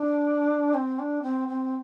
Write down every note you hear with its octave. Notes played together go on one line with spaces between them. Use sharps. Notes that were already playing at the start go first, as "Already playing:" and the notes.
Already playing: D4
C4
D4
C4
C4